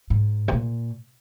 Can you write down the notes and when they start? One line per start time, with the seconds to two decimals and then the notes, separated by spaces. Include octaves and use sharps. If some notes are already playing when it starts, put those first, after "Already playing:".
0.10 G#2
0.48 C3
0.52 A#2